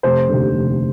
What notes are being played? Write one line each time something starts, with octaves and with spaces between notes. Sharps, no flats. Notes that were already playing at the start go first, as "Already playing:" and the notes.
F1 C5
D3
D#2
F1